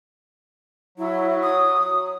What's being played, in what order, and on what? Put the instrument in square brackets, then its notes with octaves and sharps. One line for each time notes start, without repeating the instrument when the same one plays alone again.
[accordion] F#3 [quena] E4
[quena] D#6